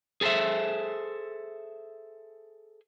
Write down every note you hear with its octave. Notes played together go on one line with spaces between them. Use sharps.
G#4 A4 B4 C5 E5